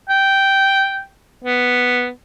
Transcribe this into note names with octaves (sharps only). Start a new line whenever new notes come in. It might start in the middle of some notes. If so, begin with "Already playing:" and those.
G5
B3